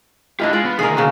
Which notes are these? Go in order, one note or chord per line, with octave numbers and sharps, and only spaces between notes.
D4 E4 F4 G4 D#5
G#3 F4 D5
B3
D2 D#3 G#4 A#4
C#3 A#3 F#4